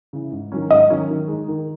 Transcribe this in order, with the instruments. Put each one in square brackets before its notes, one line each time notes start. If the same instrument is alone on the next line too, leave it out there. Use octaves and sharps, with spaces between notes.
[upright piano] C#3 E3
G#2
D#3 F#3 C#4
[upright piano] G#2 [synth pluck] D#5
[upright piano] D#3 F#3 C#4
D#3
G#3 D#4
D#3